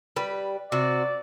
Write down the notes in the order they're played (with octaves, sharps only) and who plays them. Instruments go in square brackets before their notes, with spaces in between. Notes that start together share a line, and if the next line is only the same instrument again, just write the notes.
[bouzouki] G3 B4
[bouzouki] C3 F#4 [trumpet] D5